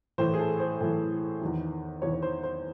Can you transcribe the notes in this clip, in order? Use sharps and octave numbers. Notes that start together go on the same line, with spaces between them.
A2 E3 C5
G#4
A4
C5
A2 E3
E2 D#3
E2 D#3 C#5
C#5
C5
C5